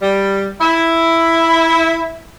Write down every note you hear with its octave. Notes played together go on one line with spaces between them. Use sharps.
G3
E4